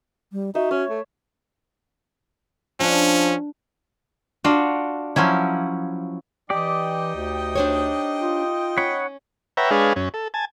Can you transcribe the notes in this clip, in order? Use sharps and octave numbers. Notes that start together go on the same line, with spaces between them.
G3
D#4 F#4 E5
C#4 C#5
A3
F3 C#4 D4
D4 F4 F#4
F3 F#3 C#4 E4
E3 D#4 G4 D5 D#5 G5
D2
D4 C5 C#5
F4
C#4 C#5 F#5 B5
B4 C#5 E5 F#5 G5 A#5
G#3 D4 G#4 B4 C#5 F5
F#2 C#4
A4
G#5 A5